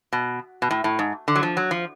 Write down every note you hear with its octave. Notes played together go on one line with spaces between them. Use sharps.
B2
B2
A2
A2
G#2
D3
F#3
F3
F#3
F3